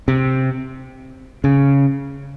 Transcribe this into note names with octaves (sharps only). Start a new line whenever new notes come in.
C3
C#3